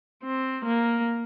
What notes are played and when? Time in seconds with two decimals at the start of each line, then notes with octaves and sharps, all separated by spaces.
0.24 C4
0.65 A#3